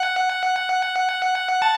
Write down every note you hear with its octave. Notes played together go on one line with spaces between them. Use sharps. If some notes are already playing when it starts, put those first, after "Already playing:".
Already playing: F#5
A5